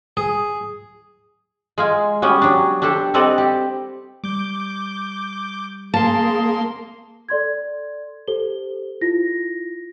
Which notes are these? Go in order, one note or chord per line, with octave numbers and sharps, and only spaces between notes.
G#4
G#3 F4 G#5
G3 B3 C#4 F#4
F#3 D4
D4 G4 A4 C5
G3 C4 A4 D5 D#5 F#5
G4
G3 D6 G6
A#3 G#4 A5 C6
A4 D5 C6 G#6
G4 A4 C5 G7
E4 F4 A#6